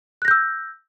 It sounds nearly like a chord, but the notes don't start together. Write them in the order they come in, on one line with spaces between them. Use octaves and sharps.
F#6 A#6 G6 E6